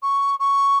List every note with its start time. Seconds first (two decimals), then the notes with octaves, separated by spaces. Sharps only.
0.02 C#6
0.39 C#6